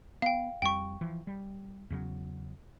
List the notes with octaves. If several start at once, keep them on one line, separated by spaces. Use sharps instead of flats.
B3 F5 G5
F2 G3 G5 C#6
E3 F3
G3
E2 C#3 F#3